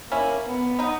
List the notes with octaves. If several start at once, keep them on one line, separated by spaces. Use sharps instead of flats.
A#3 C#4 E4
B3
B3 D#4